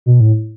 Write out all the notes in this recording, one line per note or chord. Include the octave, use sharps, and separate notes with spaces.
B2
A2